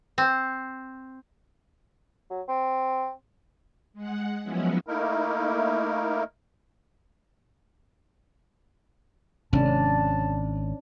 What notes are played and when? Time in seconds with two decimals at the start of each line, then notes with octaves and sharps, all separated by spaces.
0.18 C4
2.30 F#3
2.48 C4
3.93 G#3 F#5
4.43 F3 F#3 G#3 B3 C#4 E4
4.87 A3 A#3 D#4 E4 A#4
9.53 G#1 C3 C#4 D4 A5